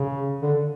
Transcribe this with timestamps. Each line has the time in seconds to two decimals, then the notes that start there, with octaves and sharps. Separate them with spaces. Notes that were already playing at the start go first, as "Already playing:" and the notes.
Already playing: C#3
0.42 D3